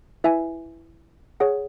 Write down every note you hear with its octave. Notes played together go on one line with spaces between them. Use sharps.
E4 B4 E5 G#5
G#4 C#5 F#5